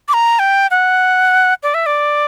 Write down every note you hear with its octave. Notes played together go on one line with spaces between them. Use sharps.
D6
A#5
G5
F#5
D5
E5
D5